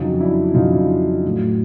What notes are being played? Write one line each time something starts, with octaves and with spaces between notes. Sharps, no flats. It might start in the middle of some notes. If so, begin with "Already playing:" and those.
Already playing: F2 C#3 F#3 D#4 F4
D4 E4
F2 C#3 F#3 D#4 F4
D4 E4
A2 F#3 A3